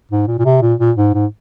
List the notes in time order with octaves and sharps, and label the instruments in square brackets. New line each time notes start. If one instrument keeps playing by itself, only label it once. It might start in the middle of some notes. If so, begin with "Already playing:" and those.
[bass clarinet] G#2
A#2
A#2
C3
A#2
A#2
G#2
G#2